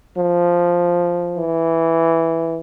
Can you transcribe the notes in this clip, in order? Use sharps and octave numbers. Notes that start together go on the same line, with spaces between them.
F3
E3